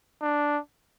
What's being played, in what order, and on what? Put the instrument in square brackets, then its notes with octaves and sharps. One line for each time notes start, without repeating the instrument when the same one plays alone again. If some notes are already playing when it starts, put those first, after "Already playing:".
[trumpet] D4